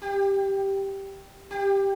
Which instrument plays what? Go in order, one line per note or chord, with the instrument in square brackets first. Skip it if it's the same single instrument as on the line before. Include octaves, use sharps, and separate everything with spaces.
[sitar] G4
G4